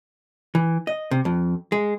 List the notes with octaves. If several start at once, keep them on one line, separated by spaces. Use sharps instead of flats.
E3
D#5
C3
F2
G#3